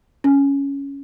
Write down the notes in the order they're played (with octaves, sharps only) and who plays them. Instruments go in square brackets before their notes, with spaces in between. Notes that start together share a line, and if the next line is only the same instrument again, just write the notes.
[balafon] C#4